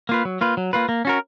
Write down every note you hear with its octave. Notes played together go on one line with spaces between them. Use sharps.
A#3 F4 B4
F#3
A#3 F4 B4
F#3
A#3 F4 B4
A#3
C#4 F#4 A#4